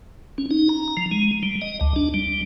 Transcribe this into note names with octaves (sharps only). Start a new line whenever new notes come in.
C#4
D#4
A#5
F3
G#3
G3
D#5
D2
D4
G3